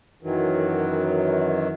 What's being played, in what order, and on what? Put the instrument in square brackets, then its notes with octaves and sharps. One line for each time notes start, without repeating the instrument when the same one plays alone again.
[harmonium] F#2 D#3 E3 F#3